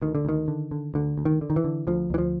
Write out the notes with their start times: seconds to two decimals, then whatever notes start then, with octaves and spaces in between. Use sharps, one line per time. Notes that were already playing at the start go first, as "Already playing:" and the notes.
0.02 D2 D#3
0.15 D3
0.25 D2 D#3
0.48 D3
0.71 D3
0.94 D2 D3
1.18 D2
1.25 D#3
1.41 D3
1.50 D#3
1.56 E3
1.64 D3
1.87 D2 F3
2.10 D2 E3
2.18 F3